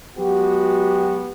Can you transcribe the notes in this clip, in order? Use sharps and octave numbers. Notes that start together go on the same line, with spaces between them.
F#3 G#3 B3 F#4 G4